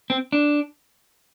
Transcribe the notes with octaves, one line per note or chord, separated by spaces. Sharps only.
C4
D4